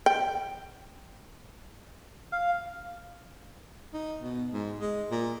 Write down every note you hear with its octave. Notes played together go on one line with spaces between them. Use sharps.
G5
F5
D#4
B2
G#2
G#3
A#2